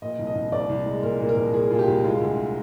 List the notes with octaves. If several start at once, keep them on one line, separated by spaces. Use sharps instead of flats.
A#2 D#5
C2
D#5
C2
C2 D5
C2
G#3
A#2 A#4
A#2
A#4
C2
A#2 G#4
A#2 F4
G4
C2
G#3 F4
D2